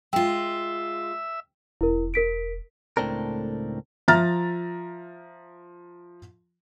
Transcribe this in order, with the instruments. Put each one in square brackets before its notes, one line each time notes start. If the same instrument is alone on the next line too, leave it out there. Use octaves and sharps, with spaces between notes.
[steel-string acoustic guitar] G#3 F4 [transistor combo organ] E5 [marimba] G5
[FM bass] E1 [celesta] E4 A#4
[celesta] A#4 B6 D7
[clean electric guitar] C#2 A2 A3 C4 D4 A#4
[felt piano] F3 E5 A#5 F6 A6